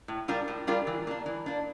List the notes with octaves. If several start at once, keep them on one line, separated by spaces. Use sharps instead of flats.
A2
G3 D4 F4 A#4
A2
G3 D4 F4 A#4
E3
A#3 D4
E3
A#3 D4